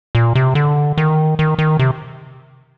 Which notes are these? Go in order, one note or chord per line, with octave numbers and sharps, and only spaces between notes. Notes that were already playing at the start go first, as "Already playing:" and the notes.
A#2
C3
D3
D#3
D#3
D#3
C3